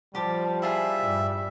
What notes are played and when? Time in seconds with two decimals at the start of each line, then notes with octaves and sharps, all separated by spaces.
0.15 F3 G3 G4 A5
0.62 E4 F4 G#4 E5
0.99 G2